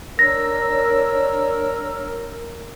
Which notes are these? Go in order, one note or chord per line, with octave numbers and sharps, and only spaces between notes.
D4 A#4 C#5 E6 A#6